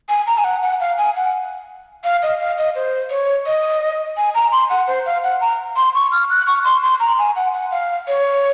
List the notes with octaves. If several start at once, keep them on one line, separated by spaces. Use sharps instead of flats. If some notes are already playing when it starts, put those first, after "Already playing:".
G#5
A#5
G#5
F#5
F#5
F5
G#5
F#5
F5
D#5
F5
D#5
C5
C#5
D#5
G#5
A#5
C6
F#5
C5
F5
F#5
A#5
C6
C#6
F6
F#6
C#6
C6
C6
A#5
G#5
F#5
F#5
F5
C#5